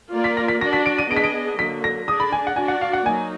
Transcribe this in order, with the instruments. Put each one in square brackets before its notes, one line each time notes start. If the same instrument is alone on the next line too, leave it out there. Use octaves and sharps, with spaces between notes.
[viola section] A#3 F4 A#4 D5
[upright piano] B6
A#6
B6
[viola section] D4 F#4 D5 [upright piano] A#6
[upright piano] B6
D7
D#7
[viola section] B3 D4 G#4 D#5 [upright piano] D7
[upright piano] B6
D7
[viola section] D3 F#3 A#3 [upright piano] B6
[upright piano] A#6
[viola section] D4 G#4 D5 [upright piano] D#6
[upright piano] B5
G#5
F#5
[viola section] D4 F#4 D5 [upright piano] G#5
[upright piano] F#5
F5
F#5
[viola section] F#3 A#3 D#4 [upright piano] G#5